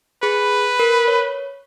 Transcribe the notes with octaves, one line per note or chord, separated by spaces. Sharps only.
G#4 B4
A#4
C#5